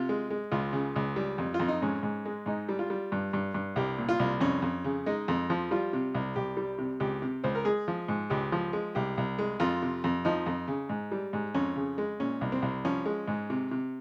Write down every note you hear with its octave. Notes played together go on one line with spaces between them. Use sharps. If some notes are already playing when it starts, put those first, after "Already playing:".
Already playing: C3 F4
G#3
G#3
C#2 F4
C#3
C#2
G3
F2
F4
F2
D#4
G#2 C#4
G#2
G#3
G#2 D#4
G3
F4
G3
G2
G2
G2
C2 G4
A#2
F4
C2
F2 C#4
F2
C#3
G#3 D#4
F2
F3
G3 F4
C3
C2
C2 G4
G3
C3
C#2 G4
C3
C#2 C5
A#4
G#3 G#4
F3
G#2
C#2 G4
F3
G#3
C2 G4
C2
G#3
F2 F4
C3
F2
F3 D#4
F2
C#3
G#2
G3
G#2
F2 C#4
C#3
G#3
A#2 C#4
C2
C4
C2
F3 C#4
G#3
G#2
C3
C3